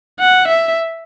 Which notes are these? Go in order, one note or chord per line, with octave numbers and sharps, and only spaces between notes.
F#5
E5